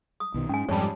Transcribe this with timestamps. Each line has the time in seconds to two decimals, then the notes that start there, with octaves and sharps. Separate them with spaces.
0.20 D#6
0.34 B1 B2 D#3
0.49 G#2 C#4 G#5
0.69 F2 G#2 G3 C#5 A5